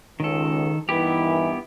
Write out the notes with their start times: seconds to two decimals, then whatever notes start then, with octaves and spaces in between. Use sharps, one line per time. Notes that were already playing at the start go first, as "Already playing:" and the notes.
0.20 C#2 D#3 A4
0.89 G2 D#3 E3 B3 E4 G4